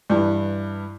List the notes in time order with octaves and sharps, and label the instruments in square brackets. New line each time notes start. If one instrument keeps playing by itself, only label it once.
[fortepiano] G2 E3